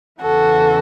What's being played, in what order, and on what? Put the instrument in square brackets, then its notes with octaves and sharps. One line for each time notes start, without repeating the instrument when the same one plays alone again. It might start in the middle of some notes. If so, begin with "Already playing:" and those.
[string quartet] E2 C#3 E3 F#4 A4